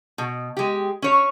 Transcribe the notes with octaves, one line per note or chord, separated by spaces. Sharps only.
B2
G#3 G4
C#4 C#5